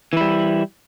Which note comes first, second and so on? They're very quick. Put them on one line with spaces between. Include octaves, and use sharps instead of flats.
E3 E4 G3